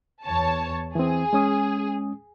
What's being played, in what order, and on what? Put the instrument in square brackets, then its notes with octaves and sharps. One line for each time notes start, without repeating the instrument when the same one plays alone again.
[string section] E2 C#5 A5
[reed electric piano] E3 C4 [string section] G#4
[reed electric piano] G#3 C#4 D#6